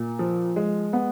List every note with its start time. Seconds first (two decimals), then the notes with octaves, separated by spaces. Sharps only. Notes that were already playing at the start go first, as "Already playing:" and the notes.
Already playing: A#2
0.19 F3
0.56 G#3
0.93 B3